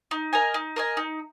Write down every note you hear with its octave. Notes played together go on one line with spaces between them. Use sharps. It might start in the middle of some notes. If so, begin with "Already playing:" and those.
D#4
A#4 D#5 G#5
D#4
A#4 D#5 G#5
D#4